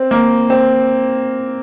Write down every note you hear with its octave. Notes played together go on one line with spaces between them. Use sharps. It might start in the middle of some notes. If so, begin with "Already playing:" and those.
Already playing: C4
A#3
C4